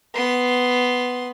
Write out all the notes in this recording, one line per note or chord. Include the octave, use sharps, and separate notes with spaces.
B3 C6